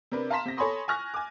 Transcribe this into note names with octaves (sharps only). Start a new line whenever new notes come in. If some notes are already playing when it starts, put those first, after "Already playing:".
C3 D4 A#4 B4
F5 A5 A#5 C6 B6 E7
C3 A#6
A4 C#5 G#5 B5 C6 D#6
G#5 C#6 F6 F#6 A#6
G#5 D6